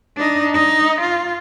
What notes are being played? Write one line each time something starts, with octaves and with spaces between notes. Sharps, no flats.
D4 D#4
D#4
F4